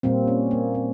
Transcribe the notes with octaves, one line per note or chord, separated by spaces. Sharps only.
A#2 G3 A#3 C4
C#4
A#3
C4